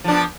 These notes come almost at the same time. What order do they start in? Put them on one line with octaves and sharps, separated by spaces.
F3 D4 B3